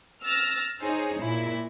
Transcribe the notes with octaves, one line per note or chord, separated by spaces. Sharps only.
E6 F6 A6 A#6
D#4 G#4 C5 C#5
A#2 E4